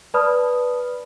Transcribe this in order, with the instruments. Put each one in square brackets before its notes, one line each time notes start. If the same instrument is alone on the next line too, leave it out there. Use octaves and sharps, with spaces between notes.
[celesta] B4 D5 A5 B5 D#6 F6